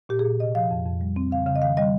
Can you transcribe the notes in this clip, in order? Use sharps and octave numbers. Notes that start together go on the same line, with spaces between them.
A#2 G4
G#4
A#2
C3 D#5
F3 F5
F2
F2
G3
C4
C#3 F5
C#3 F5
D#5
D#3 F5
G3 D#5